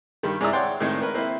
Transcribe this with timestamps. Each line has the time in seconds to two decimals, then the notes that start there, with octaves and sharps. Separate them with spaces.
0.23 G2 D#3
0.41 G#2 E4 D5 A#5 D#6 E6
0.53 C#5 D5 F#5 G5 C6
0.80 A2 D#3 G#3 C4
1.02 A#4 B4
1.14 A#3 C4 E4 B4